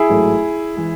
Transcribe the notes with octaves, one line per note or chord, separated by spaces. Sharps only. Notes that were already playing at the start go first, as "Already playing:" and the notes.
Already playing: E4 G#4
A1 G#2 F#3 A3
E3 G#3